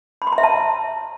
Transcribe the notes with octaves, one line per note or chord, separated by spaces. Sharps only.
B5
C6
A#5
E5
A5